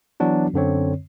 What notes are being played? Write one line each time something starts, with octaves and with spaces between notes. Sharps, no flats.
E3 F#3 B3 D4 F#4
F#2 D3 C4 C#5